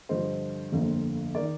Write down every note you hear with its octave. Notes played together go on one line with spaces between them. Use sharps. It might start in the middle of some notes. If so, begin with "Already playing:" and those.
G2 D3 F3 C5 D#5
G1 F2 D3 F3 A#3
D#3 A#4 D5